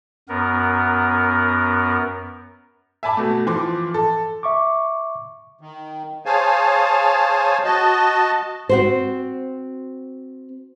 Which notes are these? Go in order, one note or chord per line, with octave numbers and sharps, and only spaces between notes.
F#2 B3 A#4
E5 G#5 A5 B5 D6
B2 A3
E3 F3 C6 D6
A4
E5 C#6 D6
D#3
G#4 C5 C#5 F5 G#5 A5
F#4 D#5 A5
C4 F#4 C5